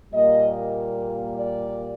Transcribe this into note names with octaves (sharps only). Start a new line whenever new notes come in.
A#2 G3 A#3 D#5
D5